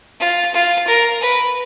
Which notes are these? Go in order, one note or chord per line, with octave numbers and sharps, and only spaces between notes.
F4
F4
A#4
B4